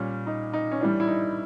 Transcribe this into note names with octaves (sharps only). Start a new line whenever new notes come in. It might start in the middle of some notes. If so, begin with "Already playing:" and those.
Already playing: A#2 G3 C#4
D#4
D#4
C#4
A2 E3 G3 D4
E4
D#4